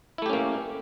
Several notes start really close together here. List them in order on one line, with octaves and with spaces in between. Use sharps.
E4 A3 G4 C#4 A#3